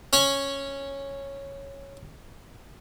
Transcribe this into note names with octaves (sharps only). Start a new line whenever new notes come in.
C#4 C#5 G#5